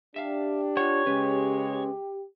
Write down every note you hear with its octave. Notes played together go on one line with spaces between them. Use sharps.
D4 G4 E5 F5
F4 C#5 F#5
C#3 G#3 C#4 B4